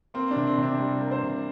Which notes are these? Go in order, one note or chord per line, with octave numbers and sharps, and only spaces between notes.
A#3 C4
D4
C3
C4
C3
D4
G3
A#3
C5
C3